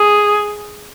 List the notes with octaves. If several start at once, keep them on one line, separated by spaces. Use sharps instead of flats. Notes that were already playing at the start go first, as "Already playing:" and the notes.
Already playing: G#4